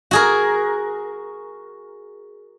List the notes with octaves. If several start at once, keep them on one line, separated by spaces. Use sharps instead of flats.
F#4 G#4 A#4